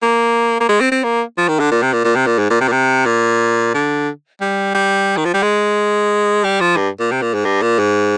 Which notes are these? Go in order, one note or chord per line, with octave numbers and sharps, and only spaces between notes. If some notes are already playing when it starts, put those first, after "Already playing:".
A#3
A#3
G#3
C4
C4
A#3
F3
D#3
D3
A#2
C3
A#2
A#2
C3
A#2
G#2
A#2
C3
A#2
C3
A#2
D3
G3
G3
D#3
F3
G3
G#3
G3
F3
G2
A#2
C3
A#2
G#2
G2
A#2
G#2